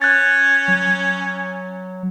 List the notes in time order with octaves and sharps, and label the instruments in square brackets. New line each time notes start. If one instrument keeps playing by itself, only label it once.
[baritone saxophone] C#4 [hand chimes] F#6 A6
[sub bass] F#3